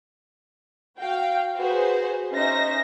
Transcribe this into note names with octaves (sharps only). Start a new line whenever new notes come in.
F#4 F5 G5
F#4 G#4 B4 C5
C#4 D#4 C5 E5 A#6